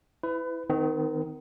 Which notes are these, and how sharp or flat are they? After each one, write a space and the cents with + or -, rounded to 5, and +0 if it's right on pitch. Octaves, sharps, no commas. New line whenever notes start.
E4 +0 B4 +30
D#3 +0 C4 -45